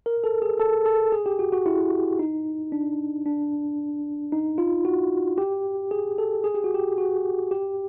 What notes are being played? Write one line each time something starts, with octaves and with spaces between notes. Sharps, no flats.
A#4
A4
G#4
A4
A4
G#4
G4
F#4
F#4
E4
D#4
D4
D4
D#4
F4
F#4
G4
G#4
A4
G#4
G4
F#4
G4
F#4
G4